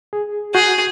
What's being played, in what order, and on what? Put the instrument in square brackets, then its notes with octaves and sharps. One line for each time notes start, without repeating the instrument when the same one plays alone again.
[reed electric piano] G#4
[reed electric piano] F#4 G6 [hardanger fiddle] G#4